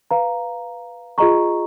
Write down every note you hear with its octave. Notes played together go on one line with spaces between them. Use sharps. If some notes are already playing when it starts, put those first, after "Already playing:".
B4 F5 A#5
F4 G#4 D#5 A#5 C#6